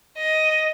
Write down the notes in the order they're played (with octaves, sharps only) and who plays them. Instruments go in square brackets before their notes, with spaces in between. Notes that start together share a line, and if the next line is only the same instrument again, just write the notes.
[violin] D#5